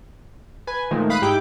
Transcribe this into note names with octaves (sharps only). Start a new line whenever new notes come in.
B4 G#5
A#2 D#3 F3 G#3 A3
F5 B5 D#6 F#6
G#2 D#4 E4 G4 G5 D6